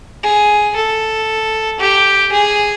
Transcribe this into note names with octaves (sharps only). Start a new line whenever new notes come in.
G#4
A4
G4
G#4